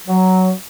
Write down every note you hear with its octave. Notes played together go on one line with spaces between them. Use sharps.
F#3